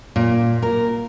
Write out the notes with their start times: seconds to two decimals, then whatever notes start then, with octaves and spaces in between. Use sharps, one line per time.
0.16 A#2
0.62 A#4